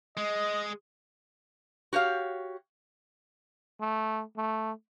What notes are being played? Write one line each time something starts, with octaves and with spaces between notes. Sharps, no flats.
G#3 D#5
F#4 G4 C#5 F5
A3
A3